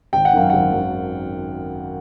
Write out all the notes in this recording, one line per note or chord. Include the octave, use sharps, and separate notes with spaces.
G#1 G5
F#5
F#2 D#3 F5
G#1 F#5
F#2 D#3